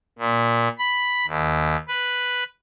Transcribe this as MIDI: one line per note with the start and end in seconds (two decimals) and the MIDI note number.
0.18 0.68 46
0.78 1.25 83
1.27 1.75 39
1.88 2.44 71